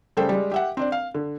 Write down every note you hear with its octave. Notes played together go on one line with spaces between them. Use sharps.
C#3 G3 A3 A4 C5 G5
G3 G#3
G4 E5 F#5
C4 D4 D5
F5
D3